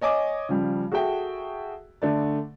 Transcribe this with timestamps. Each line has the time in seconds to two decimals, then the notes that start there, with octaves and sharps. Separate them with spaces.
0.01 C#5 D#5 G#5 D6
0.49 C#3 F3 G3
0.92 F#4 G#4 A4 E5 G5
2.02 D3 A3 D5